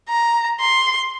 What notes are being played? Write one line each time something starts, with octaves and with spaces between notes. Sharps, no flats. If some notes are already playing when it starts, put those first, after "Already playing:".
A#5
C6